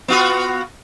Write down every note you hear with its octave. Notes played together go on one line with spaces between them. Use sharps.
B3 F4 F#4